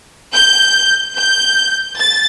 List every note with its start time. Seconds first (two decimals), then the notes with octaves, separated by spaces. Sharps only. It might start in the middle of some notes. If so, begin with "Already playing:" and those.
0.34 G6
1.17 G6
1.98 A6